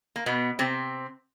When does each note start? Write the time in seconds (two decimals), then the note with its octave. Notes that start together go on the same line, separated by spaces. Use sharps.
0.16 A#3
0.26 B2 B3
0.59 C3 C4